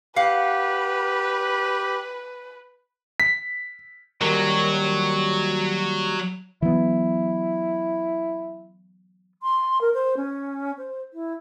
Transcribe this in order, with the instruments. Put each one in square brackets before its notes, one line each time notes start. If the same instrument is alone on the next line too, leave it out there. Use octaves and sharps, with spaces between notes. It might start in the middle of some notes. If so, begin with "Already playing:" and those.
[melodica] G4 [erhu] B4 [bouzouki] F5 F#5
[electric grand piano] B6
[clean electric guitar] D#2 G3 A#4 [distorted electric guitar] F#3
[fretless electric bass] E3 F#3 B3 [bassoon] E4
[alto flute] C6
A#4
C5
C#4
C5
E4